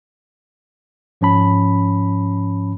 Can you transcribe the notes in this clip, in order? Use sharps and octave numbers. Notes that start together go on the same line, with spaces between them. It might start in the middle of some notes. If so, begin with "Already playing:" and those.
G#2 F3 C#4 A5 B5